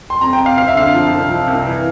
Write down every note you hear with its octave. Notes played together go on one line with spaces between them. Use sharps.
C6
F2 A#5
G5
C3
F5
C4 F5
E5
D3 F5
F3
C2
F3
C2
E3